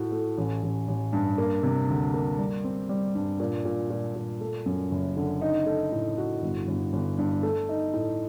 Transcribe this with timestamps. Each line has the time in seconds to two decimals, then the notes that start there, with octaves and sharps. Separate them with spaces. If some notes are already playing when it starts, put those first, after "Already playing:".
Already playing: A2 F#4
0.12 A3
0.38 A1
0.63 A1
0.88 A1
1.13 G2
1.38 A#3
1.63 C3
1.89 D2
2.14 A#3
2.39 G3
2.64 C4
2.89 G3
3.15 G2
3.40 A#2
3.65 A#2
3.90 A#2
4.16 A#2
4.41 A3
4.66 F#2
4.91 F#1
5.17 D3
5.41 D#4
5.66 A3
5.92 A2
6.18 F#4
6.42 G1
6.68 G1
6.93 G1
7.18 G2
7.43 A3
7.69 D#4
7.93 A2